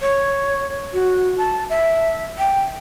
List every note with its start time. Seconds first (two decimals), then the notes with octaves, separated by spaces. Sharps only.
0.01 C#5
0.94 F#4
1.38 A5
1.70 E5
2.38 G5